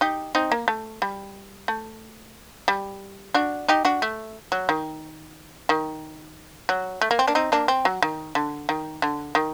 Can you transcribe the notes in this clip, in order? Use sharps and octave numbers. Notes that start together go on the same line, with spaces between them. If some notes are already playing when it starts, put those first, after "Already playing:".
D#4 G4
C4 D#4
A#3
A3
G3
A3
G3
D4 F#4
D#4 G4
D4 F#4
A3
F#3
D#3
D#3
F#3
A3
A#3
C4
A#3 D4
C4 D#4
A#3 D4
C4
F#3
D#3
D3
D#3
D3
D#3